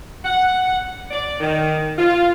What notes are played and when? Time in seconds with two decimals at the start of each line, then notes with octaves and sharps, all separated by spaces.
0.25 F#5
1.11 D5
1.40 D#3
1.98 F4